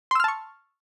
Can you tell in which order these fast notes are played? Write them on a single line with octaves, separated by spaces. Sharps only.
C6 E6 F6 A5 C#6